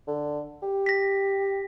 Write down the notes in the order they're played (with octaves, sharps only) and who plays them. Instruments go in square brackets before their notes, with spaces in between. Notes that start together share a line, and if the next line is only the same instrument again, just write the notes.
[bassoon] D3
G4
[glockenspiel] A#6 B6